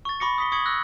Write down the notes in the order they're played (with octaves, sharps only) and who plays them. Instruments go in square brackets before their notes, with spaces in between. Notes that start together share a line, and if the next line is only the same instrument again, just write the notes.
[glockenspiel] C#6 A6
B5 C#6 D6 A#6 C#7
D#6 B6 G7
C#6 D#6 G#6 C#7 F#7
E6 F#6 A#6